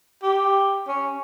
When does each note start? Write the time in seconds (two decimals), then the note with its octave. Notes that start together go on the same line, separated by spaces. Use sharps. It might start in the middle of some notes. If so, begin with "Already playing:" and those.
0.23 G4
0.88 C#4